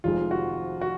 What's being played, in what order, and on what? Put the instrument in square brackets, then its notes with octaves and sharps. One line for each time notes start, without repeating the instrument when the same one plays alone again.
[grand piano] F1 F2 C3 D#3 G#3 F4
F#4
F#4